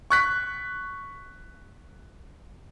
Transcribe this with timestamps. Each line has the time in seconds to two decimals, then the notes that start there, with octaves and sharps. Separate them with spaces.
0.10 C#6 F#6 B6